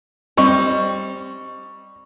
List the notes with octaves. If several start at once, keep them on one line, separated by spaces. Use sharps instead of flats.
G3 C4 D#5 C#6